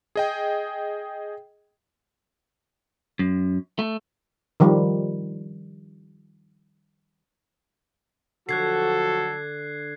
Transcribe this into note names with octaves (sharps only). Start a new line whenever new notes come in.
G#4 D#5 G5
F#2
A3
D#3 F3 G3
D3 F3 F#3 F#4 A4 F#6 G#6 C7